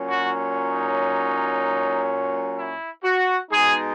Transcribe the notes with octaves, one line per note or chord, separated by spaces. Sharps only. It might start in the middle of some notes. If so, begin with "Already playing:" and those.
Already playing: A#2 F#3 C#4
F#4
D#4
E4
F#4
B2 G#3 D#4 G#4